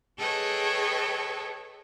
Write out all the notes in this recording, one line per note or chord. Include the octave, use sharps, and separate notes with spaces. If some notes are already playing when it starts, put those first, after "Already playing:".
G#4 A4 B4 C#5 D#5 G5